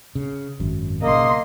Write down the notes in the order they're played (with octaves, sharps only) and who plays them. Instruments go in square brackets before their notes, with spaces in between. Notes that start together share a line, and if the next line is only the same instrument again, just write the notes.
[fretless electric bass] C#3
G#1 F#2
[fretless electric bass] B1 C#3 [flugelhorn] A#3 [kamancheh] D#5 C6